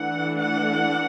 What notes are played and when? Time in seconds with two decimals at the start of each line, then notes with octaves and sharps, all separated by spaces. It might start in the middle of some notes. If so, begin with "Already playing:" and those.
Already playing: E3 A3 D4 F#5
0.39 F#5